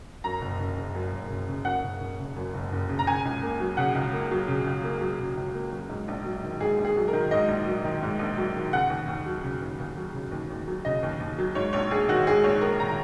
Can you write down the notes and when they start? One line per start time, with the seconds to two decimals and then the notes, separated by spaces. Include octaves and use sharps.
0.24 F#2 A#5
0.41 F#1
0.59 F#1
0.77 C#3
0.95 F#2
1.12 F#1
1.30 F#1
1.48 C#3
1.65 F#2 F#5
1.84 F#1
2.00 F#1
2.19 C#3
2.37 F#2
2.54 F#1
2.72 F#1
2.89 C#3
2.99 A#5
3.07 C#3 G#5
3.25 C#2
3.42 A#3
3.60 F#3
3.77 C#3 F#5
3.95 C#2
4.12 A#3
4.31 F#3
4.48 C#3
4.66 C#2
4.83 A#3
5.01 F#3
5.20 C#3
5.37 C#2
5.54 A#3
5.72 F#3
5.89 G#2
6.08 A#1
6.25 F#3
6.43 D#3
6.60 G#2 G#4
6.78 A#1
6.85 G#4
6.97 F#3
7.08 A#4
7.13 D#3
7.31 G#2 D#5
7.48 A#1
7.67 F#3
7.84 D#3
8.03 G#2
8.19 A#1
8.38 F#3
8.56 D#3
8.72 C#3 F#5
8.90 D#2
9.08 D#2
9.26 F#3
9.44 C#3
9.61 D#2
9.80 D#2
9.96 F#3
10.14 C#3
10.31 D#2
10.50 D#2
10.68 F#3
10.85 C#3 D#5
11.03 D#2
11.20 D#2
11.38 F#3
11.55 G#2 C#5
11.73 A#1 C#5
11.91 A#1 G#4
12.08 D#3 F#4
12.27 G#2 G#4
12.44 A#1 C#5
12.61 A#1 A#4
12.80 D#3 A#5